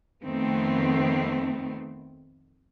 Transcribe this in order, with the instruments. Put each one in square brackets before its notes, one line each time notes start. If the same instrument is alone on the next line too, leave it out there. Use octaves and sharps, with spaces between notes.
[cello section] F2 D#3 A3 B3 C4